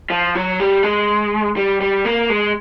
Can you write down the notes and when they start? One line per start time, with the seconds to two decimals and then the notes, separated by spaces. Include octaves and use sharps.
0.10 F3
0.35 F#3
0.60 G3
0.83 G#3
1.56 G3
1.81 G3
2.05 A#3
2.30 G#3